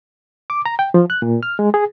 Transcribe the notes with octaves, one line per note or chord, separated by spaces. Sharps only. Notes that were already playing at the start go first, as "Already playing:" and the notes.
D6
A#5
G5
F3
F#6
A#2
F6
G#3
G#4